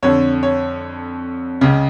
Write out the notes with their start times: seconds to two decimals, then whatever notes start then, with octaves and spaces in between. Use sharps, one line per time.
0.02 F2 D3 C#5
0.43 C#5
1.61 C#2 C#3